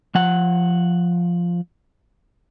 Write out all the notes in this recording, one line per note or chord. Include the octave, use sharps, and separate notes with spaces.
F3 F#5